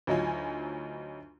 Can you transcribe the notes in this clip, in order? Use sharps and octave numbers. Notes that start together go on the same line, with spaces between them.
D2 F#3 D#4 F4 G#5